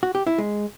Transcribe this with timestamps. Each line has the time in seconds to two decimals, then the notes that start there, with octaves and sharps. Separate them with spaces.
0.03 F#4
0.15 G4
0.27 E4
0.38 G#3